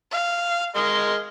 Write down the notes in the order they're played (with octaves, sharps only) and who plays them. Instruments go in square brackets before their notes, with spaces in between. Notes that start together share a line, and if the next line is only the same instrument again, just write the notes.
[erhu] F5
[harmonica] G#3 A#4 D#5 [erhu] C6